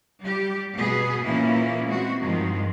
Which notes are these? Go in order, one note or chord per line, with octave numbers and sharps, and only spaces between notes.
G3 G4
B2 B3 G#4
A#2 E3 A#3 C#4 E4
G#3 C4 F#4
G2 D#3 F3 G#3